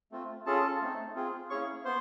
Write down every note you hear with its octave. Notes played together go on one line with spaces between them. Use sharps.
A3 C4 F4
C#4 F4 G#4 A4 A5
A3 C4 D#4
C4 F4 G#4
A#3 C#4 E4 G#4 C#5 C#6
B3 C5 C6